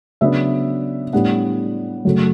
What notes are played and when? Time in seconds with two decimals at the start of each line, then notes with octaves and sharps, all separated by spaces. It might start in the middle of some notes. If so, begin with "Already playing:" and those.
0.21 C#3 F#3 B3 D4 E5
1.13 A2 G3 B3 D4 F#5
2.05 F#2 C#3 F#3 A3